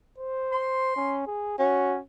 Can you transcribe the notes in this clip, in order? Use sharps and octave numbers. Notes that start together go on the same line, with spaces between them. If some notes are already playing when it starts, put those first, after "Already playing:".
C5
C6
C#4
G#4
C#4 F#4